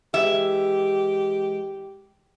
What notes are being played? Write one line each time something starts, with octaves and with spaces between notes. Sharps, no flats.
E3 G#3 G4 E5